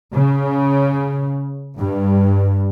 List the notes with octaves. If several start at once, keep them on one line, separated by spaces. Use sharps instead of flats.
C#3
G2